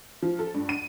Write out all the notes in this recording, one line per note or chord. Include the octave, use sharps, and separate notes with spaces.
F3
A4
G2
D#7